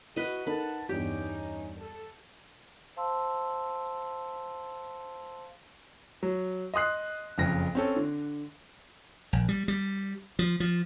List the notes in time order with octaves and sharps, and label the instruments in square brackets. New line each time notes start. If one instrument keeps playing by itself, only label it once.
[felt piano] E4 [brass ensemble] F#4 [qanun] B4 D#5
[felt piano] D#4 A4 A#4 [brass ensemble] F#5 A5 [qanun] B5
[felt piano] E2 G2 [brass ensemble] C#4 D#4 [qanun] G4
[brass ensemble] A4
[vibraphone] C5 F5 A5 C6 E6
[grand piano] F#3
D#5 C6 D#6 F#6 C7
F#1 F2 C#3 A#6
C4 C#4 A4
D3
[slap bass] A#1
G3
G3
F3
F3